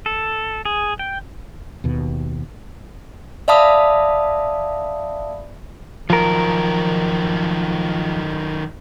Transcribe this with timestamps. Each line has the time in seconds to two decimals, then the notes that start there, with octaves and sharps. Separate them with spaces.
0.06 A4
0.65 G#4
0.99 G5
1.84 D#2 B2
3.48 D5 E5 F5 A5 B5 D#6
6.10 D#3 F3 F#3 A#4